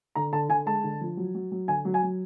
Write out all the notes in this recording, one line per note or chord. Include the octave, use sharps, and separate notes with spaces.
D3 A#5
D3 A5
D3 G#5
G#3 A5
D3
F3
F#3
F#3
F#3
D3 G#5
F#3
G#5
F#3